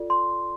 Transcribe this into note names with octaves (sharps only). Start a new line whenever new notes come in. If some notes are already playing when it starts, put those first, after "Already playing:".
Already playing: F4 A4 D5
C6